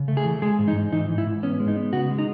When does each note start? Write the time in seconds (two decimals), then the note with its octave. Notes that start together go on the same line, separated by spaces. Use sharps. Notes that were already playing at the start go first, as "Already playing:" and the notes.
Already playing: C#3
0.08 A3
0.17 G#4
0.25 E3
0.42 G#3 G#4
0.59 G#2
0.68 D#4
0.76 G#2
0.93 E3 D#4
1.09 E3
1.18 E4
1.26 G#2
1.43 B3 C#4
1.60 G#3
1.68 D#4
1.76 B3
1.93 C#3 F#4
2.10 G#3
2.19 D#4